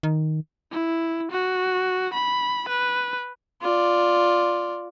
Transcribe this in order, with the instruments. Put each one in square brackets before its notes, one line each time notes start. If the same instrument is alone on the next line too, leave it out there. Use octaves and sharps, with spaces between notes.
[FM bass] D#3
[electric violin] E4
F#4
B5
B4
[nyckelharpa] F4 D5